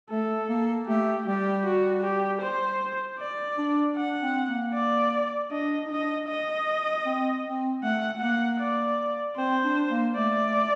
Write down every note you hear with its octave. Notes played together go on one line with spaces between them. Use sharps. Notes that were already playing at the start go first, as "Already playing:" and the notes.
A3 A4
A#3
A3 G4
G3 G4
F#4
G4
C5
D5
D4
D4 F#5
C4
A#3
D5
D4 D#5
D#4
D4 D#5
D#5
C4
C4
A3 F#5
A#3 F#5
D5
C4 C5
D4
A#3
A3 D5